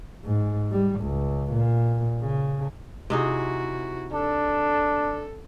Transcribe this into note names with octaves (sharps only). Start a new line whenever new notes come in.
G#2
G3
C#2
A#2
C#3
C3 D#4 E4 F#4 G#4
D4 A4